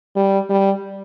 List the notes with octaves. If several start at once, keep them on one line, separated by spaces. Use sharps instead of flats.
G3
G3